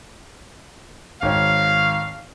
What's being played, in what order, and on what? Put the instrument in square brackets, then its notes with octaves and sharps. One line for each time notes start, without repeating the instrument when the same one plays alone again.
[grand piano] G#1 C#5 [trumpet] F5